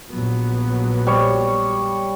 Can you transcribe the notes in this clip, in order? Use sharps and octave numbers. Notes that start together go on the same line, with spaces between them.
A#1 F#3 B3
G3 C#5